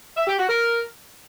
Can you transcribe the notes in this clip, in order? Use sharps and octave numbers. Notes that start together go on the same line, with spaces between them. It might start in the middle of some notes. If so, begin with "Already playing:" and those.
E5
G4
F#4
A#4